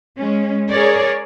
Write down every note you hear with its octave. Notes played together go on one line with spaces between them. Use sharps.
G#3 C#4
G#4 A#4 C#5 D5